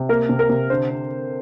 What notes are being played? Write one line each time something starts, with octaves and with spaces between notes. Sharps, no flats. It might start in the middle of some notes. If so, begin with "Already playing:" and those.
Already playing: C3
A#3 A#4
C3
A#4
C3
D3 C5
C4